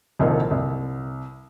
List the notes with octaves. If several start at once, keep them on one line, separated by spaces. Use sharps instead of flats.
D#1 C2 F3 D#4 A#4
C2